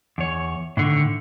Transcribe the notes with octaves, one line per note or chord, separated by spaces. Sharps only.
E2 C#5
A2 D3 D#3